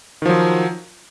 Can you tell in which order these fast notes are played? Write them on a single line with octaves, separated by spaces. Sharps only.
D#3 F3 F#3